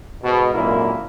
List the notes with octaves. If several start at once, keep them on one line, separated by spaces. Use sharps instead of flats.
G#2 B2
G#1 F#2 A#2 D3 A#3 E4